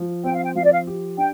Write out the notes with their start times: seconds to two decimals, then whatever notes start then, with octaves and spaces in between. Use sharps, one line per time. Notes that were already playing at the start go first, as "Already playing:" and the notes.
Already playing: F3
0.24 C4 G5
0.35 F5
0.44 G5
0.55 F3 F5
0.64 D5
0.73 F5
0.87 G4
1.18 D4 G5